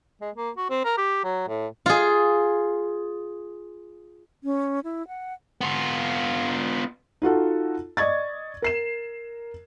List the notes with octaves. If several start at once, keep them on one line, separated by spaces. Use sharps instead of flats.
G#3
A#3
F#4
C4
A#4
G4
F#3
A2
F4 G#4
C#4
E4
F#5
B3 F4
D#4 F4 F#4 A4
D5 D#5 C#6 G#6 A6
A#4 C7 E7